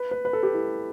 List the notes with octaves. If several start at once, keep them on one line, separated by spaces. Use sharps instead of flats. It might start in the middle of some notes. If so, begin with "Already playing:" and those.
Already playing: B4
B4
B4
A4
G4
E4